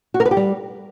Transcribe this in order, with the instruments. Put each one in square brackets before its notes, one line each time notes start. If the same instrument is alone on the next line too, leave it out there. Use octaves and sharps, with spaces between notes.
[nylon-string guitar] F#4
A#4
B4
G4
G3